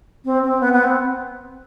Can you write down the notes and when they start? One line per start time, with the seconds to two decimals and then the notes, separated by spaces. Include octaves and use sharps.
0.25 C4
0.43 C4
0.61 B3
0.73 B3
0.84 C4